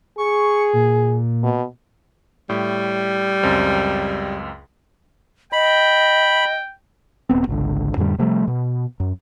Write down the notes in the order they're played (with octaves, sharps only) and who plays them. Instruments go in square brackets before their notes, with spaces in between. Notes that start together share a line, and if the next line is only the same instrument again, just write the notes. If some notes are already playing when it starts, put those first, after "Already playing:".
[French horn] G#4 [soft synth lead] C#6
[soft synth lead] A#2
[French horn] B2
[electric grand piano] A2 [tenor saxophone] G3
[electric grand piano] C#2 F#2 C4
[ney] D#5 [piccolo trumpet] G5 [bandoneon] B5
[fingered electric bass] D#1 A#2 B3 C4
G#1 C#2 D3
F2 A2 D3 G3
C3 F3 G3 A3
B2
F#2